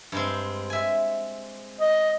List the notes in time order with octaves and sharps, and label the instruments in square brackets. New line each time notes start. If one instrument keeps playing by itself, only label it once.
[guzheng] G2 G#3 C4
E5 G#5
[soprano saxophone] D#5